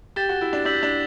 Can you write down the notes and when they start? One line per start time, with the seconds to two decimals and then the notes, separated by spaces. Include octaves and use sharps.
0.16 G4 A6 E7 G7
0.29 F#4
0.41 E4
0.53 D4
0.65 D4 E6 G6 B6 F#7
0.83 D4